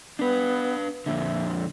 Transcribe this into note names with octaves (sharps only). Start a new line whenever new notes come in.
B3 D4 B4
F2 A#2 D3 E5